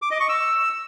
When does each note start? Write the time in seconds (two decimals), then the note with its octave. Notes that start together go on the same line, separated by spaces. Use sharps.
0.02 D6
0.11 D#5
0.20 C#6
0.29 E6